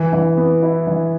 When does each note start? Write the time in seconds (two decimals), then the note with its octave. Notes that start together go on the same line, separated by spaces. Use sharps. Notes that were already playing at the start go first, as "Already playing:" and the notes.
Already playing: E3
0.13 E3
0.37 B3
0.62 E4
0.87 E3